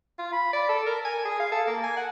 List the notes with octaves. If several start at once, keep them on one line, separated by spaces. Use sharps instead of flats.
F4
B5
D5
A4
A#4
G#5
G#4
F5
A4
A#3
G#5
F#5